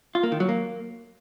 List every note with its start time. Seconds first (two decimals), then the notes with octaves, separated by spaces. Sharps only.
0.15 F4
0.23 A#3
0.32 D#3
0.40 F#3
0.49 A#3